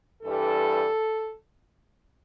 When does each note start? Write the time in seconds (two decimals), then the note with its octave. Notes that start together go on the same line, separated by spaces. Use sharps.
0.23 G2 E3 G3 A4